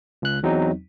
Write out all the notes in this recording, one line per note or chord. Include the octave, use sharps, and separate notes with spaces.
C#2 F#6
E2 F#3 C4 D#4